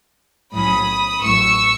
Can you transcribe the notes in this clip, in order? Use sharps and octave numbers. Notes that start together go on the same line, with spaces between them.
B1 A2 F#3 C#4 B5 D#6
A1 A2 F#3 C#6 E6